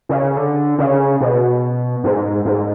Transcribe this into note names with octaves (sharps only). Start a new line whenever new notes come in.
C#3
D3
C#3
B2
G#2
G#2